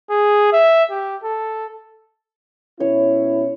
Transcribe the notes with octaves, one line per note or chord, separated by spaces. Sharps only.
G#4
E5
G4
A4
B2 C#4 E4 C#5